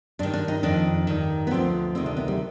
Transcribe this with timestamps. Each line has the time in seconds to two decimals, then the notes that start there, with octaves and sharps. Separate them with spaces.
0.19 G2 D#3 D4
0.33 D4
0.48 D#4
0.63 F2 D#3 D4
1.07 G2 D#3
1.47 B3
1.51 D2 D3 F3 C4
1.95 D2 C3 D#3 C4
2.06 D4
2.17 B3
2.28 G3